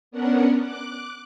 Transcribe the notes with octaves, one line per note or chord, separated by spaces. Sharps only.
B3 C#4 D4 A#4 F#5
D6 F#6